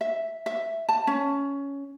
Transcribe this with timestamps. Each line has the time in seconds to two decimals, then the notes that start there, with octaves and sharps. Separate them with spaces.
0.01 E5
0.46 E5
0.89 A5
1.07 C#4